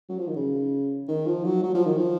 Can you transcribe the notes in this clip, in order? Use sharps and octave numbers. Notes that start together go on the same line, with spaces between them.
F#3
F3
D#3
C#3
D#3
F3
F#3
F#3
F3
D#3
F3